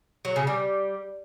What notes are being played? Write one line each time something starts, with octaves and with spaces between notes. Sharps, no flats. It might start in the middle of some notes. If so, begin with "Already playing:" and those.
F#3
C#3
G3